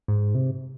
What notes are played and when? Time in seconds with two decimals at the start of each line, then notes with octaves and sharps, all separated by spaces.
0.08 G#2
0.35 C3